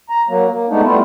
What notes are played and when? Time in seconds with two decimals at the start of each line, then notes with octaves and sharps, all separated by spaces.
0.09 A#5
0.29 F#3 A#3
0.49 A#3
0.69 G#3 A3 B3 D4 D#4
0.83 G3 A3 B3 E4 F4